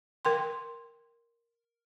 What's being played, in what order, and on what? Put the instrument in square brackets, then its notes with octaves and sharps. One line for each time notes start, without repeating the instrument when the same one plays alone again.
[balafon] A#4 G5 C6